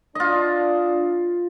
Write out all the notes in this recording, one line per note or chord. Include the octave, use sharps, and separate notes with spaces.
D4 F4 D#5